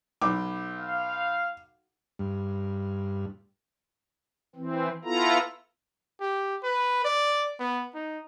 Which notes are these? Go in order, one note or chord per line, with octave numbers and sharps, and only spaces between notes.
B1 D6
F5
G2
E3 C4
B3 E4 F4 A4 A#5
G4
B4
D5
B3
D#4